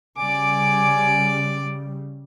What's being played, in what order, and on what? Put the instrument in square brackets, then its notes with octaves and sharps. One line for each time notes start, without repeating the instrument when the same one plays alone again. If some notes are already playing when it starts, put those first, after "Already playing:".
[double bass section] C#3 G3 [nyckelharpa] D5 D6 [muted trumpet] G#5